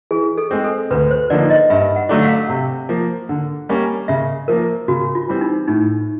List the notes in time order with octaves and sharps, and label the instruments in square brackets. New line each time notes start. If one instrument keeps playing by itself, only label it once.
[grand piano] E3 [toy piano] G#4
[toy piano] A4
[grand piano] G#3 C4
[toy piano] A4
[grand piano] D2 [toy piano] B4
[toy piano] C5
[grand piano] D3 F3 A#3 D#4 [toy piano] D5
[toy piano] D#5
[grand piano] G2 [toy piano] E5
[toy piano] F#5
[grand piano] D3 F#3 A3 D4
[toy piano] F#5
F5
[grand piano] C3
F3 A#3
D3
G3 A#3 C#4
[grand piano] C#3 [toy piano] E5
[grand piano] F3 A#3 [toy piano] A#4
[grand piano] C#3 [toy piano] F#4
[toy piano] F4
[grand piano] E3 G3 C4
[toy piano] D#4
[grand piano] A2 [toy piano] D#4